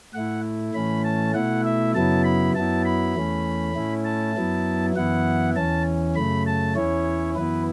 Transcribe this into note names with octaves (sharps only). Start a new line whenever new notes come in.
A2 A3 E4 F#5
A2 E3 A3 C#4 B5
A5
B2 A3 E4 F#5
E5
F#2 C#3 F#3 B3 E4 A5
B5
F#2 F#3 B3 E4 A5
B5
E2 E3 A3 C#4
A2 A3 C#4 E4
A5
F#2 F#3 B3 E4
F#2 E3 B3 E4 F#5
E2 E3 C#4 A5
F#2 C#3 A3 B5
A5
E2 E3 C#4 E4 C#5
F#2 E3 B3 E4 B4